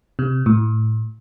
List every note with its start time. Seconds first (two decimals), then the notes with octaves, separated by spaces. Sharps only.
0.19 C3
0.46 A2